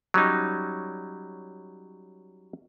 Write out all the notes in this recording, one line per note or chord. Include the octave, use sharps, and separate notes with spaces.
F#3 G3 C#4 D#4